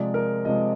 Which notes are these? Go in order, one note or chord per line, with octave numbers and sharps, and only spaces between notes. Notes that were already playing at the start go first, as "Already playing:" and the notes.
Already playing: C3 F3 G#3 D5
A#4
C3 F3 G#3 D#5